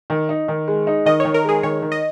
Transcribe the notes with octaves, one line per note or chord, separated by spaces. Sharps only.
D#3
D#4
D#3
G#3
D#4
D#3 D#5
D#3 C#5
A#4
G#3 G#4
D#3 C#5
D#3
D#5